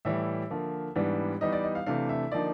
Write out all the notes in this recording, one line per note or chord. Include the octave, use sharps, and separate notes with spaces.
A2 E3 G3 E5
D3 F3 A#3
G#2 E3 G3 B3 D4
E3 G3 B3 D#4 D#5
D5
D#5
F5
C3 E3 A3 D4 F5
E5
D3 F3 A#3 D#4 D5